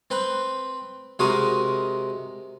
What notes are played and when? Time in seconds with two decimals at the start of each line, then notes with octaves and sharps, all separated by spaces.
0.10 C4 B4
1.19 C3 G#3 F#4 A#4 D#6